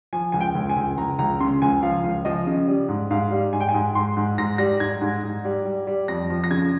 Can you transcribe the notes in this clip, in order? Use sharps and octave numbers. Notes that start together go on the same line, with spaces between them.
F3 G#5
C#2 G#5
G5
C#2
G#5
C#2
C#2 A#5
C#2 A#5
C#3 C6
C#2 G#5
F3 F5
C#2
F3 D#5
C#3
G3
G#2
G#2 F5
G3
G#2 G#5
G5
G#5
G#2
G#2 C6
G#2
G#2 A#6
G3 A#6
G#2 G#6
G#2
G#2
G3
G3
G3
F2 A#6
F3
A#6
C#3 G#6